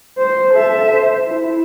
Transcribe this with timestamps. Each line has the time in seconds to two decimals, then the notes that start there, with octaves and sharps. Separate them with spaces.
0.19 C5
0.54 A4 E5
0.92 C5
1.27 E4